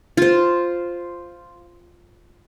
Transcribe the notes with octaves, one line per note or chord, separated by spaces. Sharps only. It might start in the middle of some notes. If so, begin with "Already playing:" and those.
F4 C5